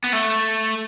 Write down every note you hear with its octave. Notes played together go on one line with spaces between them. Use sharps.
B3
A3